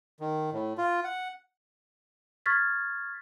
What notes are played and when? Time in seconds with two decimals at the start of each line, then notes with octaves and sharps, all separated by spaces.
0.20 D#3
0.53 A2
0.78 F4
1.04 F#5
2.46 C#6 F6 G#6 A6 B6